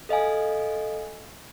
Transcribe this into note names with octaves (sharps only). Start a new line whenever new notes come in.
A4 D#5 F5 G#5